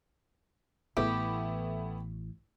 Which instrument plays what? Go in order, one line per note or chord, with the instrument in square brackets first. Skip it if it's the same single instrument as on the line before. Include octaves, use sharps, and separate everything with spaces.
[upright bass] A1 E3 [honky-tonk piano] A3 B3 E4 [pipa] G4